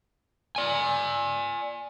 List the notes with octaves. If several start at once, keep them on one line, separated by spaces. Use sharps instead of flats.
D5 G#5